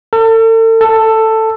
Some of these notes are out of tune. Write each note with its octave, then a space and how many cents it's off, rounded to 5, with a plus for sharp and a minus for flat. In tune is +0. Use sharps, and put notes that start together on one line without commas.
A4 +40
A4 +10